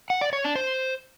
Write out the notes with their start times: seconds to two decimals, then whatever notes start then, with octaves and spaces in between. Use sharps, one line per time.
0.10 F#5
0.21 D5
0.33 C#5
0.44 D4
0.55 C5